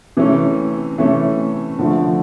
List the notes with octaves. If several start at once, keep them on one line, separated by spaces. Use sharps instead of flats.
C3 E3 A3 C#4
C3 E3 A3 C#4
D3 F3 A3